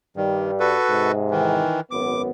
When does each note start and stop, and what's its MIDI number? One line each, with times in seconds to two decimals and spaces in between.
0.16 0.75 43
0.16 0.51 51
0.16 0.75 55
0.60 1.12 66
0.60 1.12 69
0.60 1.12 71
0.90 1.63 44
0.90 1.63 48
1.31 1.81 51
1.31 1.81 52
1.91 2.31 32
1.91 2.31 42
1.91 2.31 59
1.91 2.22 86